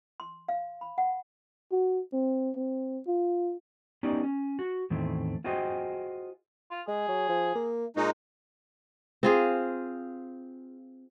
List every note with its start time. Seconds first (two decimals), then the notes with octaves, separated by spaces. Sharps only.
0.20 C6
0.49 F5
0.81 B5
0.98 F#5
1.72 F#4
2.13 C4
2.56 C4
3.07 F4
4.03 B3 C#4 D#4 G4 A#4 D5
4.23 C#4
4.59 F#4
4.90 E2 A2 D#3 A3 C4
5.44 F4 F#4 G#4 C5 D#5 G5
6.71 F4
6.88 G#3 G#4
7.09 F#3
7.29 F3
7.55 A#3
7.96 A#2 G#3 C#4 D#4
9.23 C4 F4 G#4